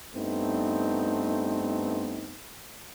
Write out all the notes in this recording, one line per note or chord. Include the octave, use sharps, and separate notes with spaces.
G2 A3 B3 C4 D#4